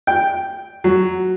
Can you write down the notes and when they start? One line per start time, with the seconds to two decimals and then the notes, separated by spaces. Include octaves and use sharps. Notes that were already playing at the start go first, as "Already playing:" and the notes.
0.07 G5
0.84 F#3